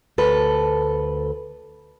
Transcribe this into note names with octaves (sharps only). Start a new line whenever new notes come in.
D2 A4 B4